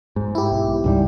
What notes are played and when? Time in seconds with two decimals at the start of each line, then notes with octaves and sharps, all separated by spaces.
0.16 G#2
0.35 E4 G4
0.52 B1
0.84 C#2 G#2 G3